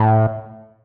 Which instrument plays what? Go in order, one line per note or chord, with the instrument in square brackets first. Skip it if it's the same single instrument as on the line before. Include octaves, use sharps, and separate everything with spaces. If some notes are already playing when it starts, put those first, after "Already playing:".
Already playing: [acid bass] A2